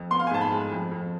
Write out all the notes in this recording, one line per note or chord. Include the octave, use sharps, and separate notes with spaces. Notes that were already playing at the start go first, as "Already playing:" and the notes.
Already playing: F2
B3 C6
F5
G#5
G#2 A5
B5
G#3
F2
F2